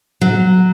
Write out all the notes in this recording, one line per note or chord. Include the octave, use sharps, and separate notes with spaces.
F#3